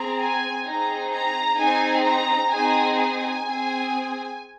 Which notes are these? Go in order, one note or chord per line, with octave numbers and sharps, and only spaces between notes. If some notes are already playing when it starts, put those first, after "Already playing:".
Already playing: C4 G#4 A#5
G#5
C4 D#4 G#4 A#5
A#5
C4 D#4 G#4 G#5
A#5
C4 D#4 G#4 G#5
G#5
C4 G#4